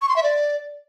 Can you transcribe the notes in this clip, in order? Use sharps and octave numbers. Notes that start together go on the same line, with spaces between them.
C#6
C6
E5
D5